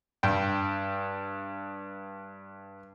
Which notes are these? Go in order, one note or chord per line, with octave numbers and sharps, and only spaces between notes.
G2 G5